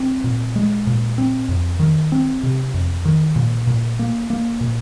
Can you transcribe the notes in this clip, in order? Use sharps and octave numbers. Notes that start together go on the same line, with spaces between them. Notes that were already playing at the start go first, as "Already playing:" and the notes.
Already playing: C4
A#2
G#3
A#2
C4
F2
D#3
C4
C3
F2
D#3
A#2
A#2
A#3
A#3
A#2